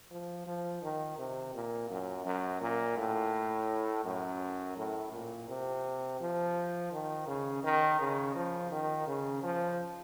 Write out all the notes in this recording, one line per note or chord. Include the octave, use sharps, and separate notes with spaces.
F3
F3
D#3
C3
A#2
F#2
F#2
A#2
A2
F#2
A2
A#2
C3
F3
D#3
C#3
D#3
C#3
F3
D#3
C#3
F3